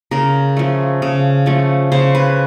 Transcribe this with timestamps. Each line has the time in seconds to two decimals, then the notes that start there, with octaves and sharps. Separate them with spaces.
0.11 C#3 A#4
0.57 F3 A3
1.02 C#3
1.46 F3 A3
1.92 C#3 C5
2.15 B4